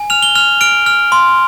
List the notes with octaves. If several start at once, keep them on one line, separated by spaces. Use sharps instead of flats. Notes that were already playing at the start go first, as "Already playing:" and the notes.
Already playing: G#5
F6 F7
G7
F6 F7
F6 D7
F6
C6